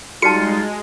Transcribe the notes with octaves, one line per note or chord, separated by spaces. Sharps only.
G3 G#3 D#4 F4 F#4 A5 C#7